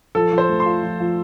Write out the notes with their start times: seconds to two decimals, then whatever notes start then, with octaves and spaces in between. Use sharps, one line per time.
0.15 F3 A4
0.33 F3
0.38 C5
0.49 A3
0.60 C6
0.66 F4
0.83 F3
1.00 F3